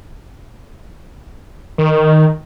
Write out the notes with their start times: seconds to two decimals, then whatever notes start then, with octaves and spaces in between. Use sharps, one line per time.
1.78 D#3